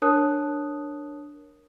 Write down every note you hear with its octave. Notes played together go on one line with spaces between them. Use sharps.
D4 A#4 C#5 A5 D#6 F#6